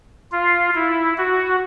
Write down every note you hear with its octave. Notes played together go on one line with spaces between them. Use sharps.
F4
E4
F#4